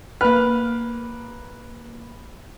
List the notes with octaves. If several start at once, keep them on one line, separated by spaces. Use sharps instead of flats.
A#3 B4 F6